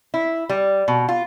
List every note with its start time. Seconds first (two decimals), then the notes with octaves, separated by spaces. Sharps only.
0.14 E4
0.49 G3
0.88 B2
1.09 F4